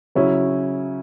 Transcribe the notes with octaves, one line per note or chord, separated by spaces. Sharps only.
C#3 F#3 C#4 E4